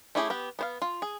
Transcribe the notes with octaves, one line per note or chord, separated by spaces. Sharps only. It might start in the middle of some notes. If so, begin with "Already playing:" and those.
A3 C#4 E4 G4 G#4
B3 G4
B3 C5 F5
F4
G#4